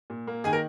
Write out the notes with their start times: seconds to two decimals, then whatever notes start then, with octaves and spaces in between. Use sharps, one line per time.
0.10 A#2
0.27 A#3
0.44 D#3 G#4 G#5
0.53 A#4